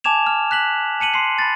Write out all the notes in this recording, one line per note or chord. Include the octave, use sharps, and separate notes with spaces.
G#5 A5 D6 G#6 E7 F7
F6
F#6 B6 F#7
A5 C#7 D#7 F#7
C6 C7
B5 A6